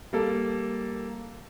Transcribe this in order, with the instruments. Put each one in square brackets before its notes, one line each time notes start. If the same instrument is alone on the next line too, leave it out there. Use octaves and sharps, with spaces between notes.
[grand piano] G3 A#3 A4